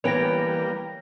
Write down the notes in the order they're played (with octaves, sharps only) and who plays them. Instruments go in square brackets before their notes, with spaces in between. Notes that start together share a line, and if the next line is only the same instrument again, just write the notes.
[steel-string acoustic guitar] D2 E3 G5 [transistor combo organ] G3 A#3 [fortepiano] B3 [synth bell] C#5 A#6